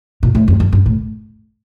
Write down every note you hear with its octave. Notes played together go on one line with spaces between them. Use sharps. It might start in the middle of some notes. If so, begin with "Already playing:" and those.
A#2
A2
F2
F2
G2
A2